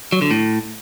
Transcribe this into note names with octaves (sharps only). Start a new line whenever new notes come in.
F#3
D3
A2